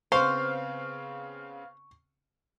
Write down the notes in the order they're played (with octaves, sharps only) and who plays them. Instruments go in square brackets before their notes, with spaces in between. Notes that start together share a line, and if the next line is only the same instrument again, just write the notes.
[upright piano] C#3 B3 C4 [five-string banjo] C5 [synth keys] F5 [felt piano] C#6